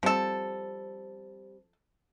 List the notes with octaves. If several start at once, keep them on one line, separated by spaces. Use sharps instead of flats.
F3 G3 C4 A4